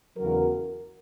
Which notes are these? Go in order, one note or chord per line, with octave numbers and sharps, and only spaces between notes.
E2 C#3 F#3 F#4 A#4